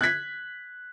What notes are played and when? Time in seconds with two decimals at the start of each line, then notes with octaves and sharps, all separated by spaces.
0.01 F#6 G#6 B6